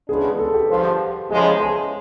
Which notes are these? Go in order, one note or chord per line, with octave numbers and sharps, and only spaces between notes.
C#3 E3 G#3 B3 D4 G#4
A4
G4
G2 D3 F3
E2 C#3 F3 G#3 G#4
G#4